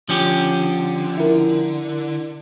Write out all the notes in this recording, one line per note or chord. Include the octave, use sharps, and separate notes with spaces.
D3 F3 C#4 G4
E4 A#4